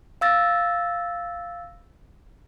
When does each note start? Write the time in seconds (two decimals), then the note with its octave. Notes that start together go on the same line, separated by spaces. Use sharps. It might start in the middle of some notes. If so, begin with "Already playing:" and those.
0.21 F5 E6 A6 A#6